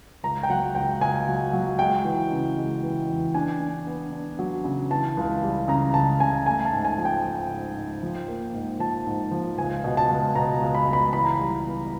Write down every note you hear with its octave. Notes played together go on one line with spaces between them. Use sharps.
C#2 A#5
G5
F#3 F#5
C#2 G5
C#2 G#5
F#3
F#3
G#3 G5
E3
C#3
G#3
E3
E2
D4 G#5
D4
B3
D4
F#3
C#3
E3 A5
C#2
G3
C#3 A#5
C#2 A5
C#3 G#5
A3 G#5
A5
G#2
G#5
F3
G5
F3
G#2
G#2
F3
A#3
G#2
F3 A5
G#2
F3
C#2 G#5
B2
A5
C#2
B2 A#5
C#2
B5
C#2
B5
E3 B5
A#5
G3 B5
B3